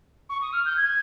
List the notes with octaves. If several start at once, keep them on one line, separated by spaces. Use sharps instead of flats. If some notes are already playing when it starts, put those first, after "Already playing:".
C#6
D#6
F6
G6
G#6